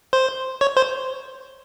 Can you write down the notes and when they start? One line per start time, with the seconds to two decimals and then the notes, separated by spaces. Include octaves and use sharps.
0.13 C5
0.61 C#5
0.77 C5